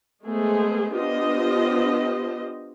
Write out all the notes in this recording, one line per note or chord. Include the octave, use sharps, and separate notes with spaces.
G#3 A3 B3 G#4 C5
B3 D4 F4 G4 C5 D#5